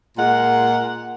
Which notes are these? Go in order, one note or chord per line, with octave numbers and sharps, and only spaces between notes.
A#2 G#3 A#4 F#5